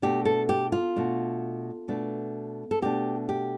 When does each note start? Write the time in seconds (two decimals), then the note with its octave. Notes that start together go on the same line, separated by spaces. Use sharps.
0.02 B2 A3 D4 G4
0.25 A4
0.49 G4
0.72 F4
0.96 B2 A3 D4
1.88 B2 A3 D4
2.71 A4
2.82 B2 A3 D4 G4
3.29 G4